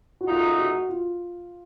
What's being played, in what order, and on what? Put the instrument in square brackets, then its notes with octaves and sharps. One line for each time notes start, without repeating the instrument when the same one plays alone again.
[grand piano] F#4
[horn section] F#2 C#3 A3 D#4 [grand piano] F4
[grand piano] F#4
F4